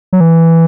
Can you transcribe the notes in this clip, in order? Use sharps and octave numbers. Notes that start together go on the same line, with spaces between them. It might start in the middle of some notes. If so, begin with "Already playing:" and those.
F#3
E3